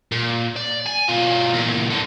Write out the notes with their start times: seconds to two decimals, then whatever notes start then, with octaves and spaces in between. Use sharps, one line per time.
0.12 A#2
0.56 D5
0.86 G#5
1.08 B2 F4
1.53 A#2 E3
1.90 G2 D3